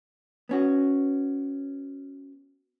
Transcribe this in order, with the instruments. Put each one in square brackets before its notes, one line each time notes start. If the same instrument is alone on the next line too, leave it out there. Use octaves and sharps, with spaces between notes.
[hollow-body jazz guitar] B3 C#4 F#4